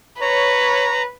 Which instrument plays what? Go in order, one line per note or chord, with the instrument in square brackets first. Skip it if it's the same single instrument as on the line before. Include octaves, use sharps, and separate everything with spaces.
[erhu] B4 [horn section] C#5 [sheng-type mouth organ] A#5